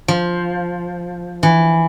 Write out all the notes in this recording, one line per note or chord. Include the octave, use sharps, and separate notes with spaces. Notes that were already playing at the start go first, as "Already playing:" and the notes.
F3
E3